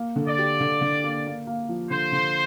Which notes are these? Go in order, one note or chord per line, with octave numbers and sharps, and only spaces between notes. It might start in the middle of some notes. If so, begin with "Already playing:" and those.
Already playing: A#3
D3
D5
G4
D3
D3
A#3
A#3
A#3
F3
D3 C5
D3